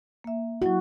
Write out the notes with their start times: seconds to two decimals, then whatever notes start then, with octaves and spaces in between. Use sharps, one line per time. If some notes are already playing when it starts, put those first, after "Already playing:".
0.24 A#3 E5
0.62 F#3 E4 F#4